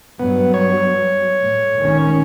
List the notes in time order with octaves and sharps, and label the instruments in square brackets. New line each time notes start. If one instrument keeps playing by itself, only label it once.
[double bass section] G2 F#3 [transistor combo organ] B3
[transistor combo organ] C#5
[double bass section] A2
D#3 G#3 C#4